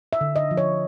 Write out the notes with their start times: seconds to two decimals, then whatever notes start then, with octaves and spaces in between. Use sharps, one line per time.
0.13 E5
0.21 D3
0.36 D#5
0.51 F3
0.57 C#5